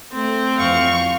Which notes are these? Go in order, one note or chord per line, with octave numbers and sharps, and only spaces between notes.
A3 C4
F2 E3 F5 C#6